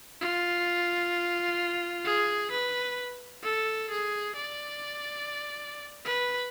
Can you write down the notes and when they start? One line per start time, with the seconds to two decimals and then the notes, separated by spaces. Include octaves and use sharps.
0.21 F4
2.05 G#4
2.51 B4
3.43 A4
3.90 G#4
4.36 D5
6.06 B4